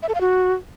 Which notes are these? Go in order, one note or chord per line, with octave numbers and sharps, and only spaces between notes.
E5
A4
F5
F#4